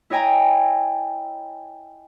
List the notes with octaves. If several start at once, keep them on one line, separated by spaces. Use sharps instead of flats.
E4 C#5 D#5 G5 G#5 A#5